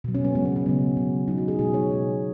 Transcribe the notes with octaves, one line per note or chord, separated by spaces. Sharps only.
B2 F#3
C#4
B3
C#3 G#3 C#4
C#4
B3
C#3 F#3 C#4
C#3 G#3
C#3 F#3 D#4
F#4
G#4
B2 G#3 G#4
C#5
B2 G#3